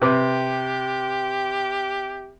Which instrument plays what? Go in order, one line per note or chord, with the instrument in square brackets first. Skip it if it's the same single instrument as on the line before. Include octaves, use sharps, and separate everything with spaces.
[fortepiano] C3 B4 D6 [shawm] G4